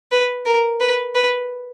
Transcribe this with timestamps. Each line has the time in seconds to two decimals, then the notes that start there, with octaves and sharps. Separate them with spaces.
0.12 B4
0.45 A#4
0.80 B4
1.15 B4